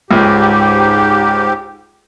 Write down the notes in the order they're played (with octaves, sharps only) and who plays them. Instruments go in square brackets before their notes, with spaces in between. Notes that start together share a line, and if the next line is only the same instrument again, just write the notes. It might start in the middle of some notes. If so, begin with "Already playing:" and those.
[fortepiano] C#2 [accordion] G#2 G4